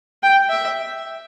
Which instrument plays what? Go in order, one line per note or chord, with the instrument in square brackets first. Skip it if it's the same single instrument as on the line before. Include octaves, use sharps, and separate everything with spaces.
[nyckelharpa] G5
E5